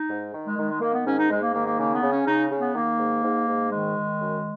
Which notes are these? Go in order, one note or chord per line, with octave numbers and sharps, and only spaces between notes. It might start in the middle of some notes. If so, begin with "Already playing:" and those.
Already playing: D#4
G#2
D#3
G#3
D#3 G#3
G#3
D#3 A#3
B3
G#2 C#4
D#4
G#2 G#3
A#3
D#3 A#3
A#3
C#3 A#3
B3
C#3
C#4
C#3 D#4
C#3
B3
D#3 A#3
G#2
G#2
G#2
D#3 G#3
D#3
F#2